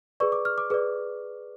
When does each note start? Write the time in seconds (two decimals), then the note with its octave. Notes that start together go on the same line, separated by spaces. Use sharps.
0.20 G#4 B4 D5 C#6
0.32 D6
0.45 F6
0.58 D6
0.70 G#4 B4 D5